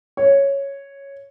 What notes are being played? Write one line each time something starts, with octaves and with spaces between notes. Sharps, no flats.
C#5